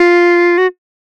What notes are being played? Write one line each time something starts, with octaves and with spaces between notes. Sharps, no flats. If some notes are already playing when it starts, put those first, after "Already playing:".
Already playing: F4
F#4